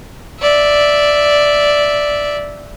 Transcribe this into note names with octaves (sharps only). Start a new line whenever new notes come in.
D5 E5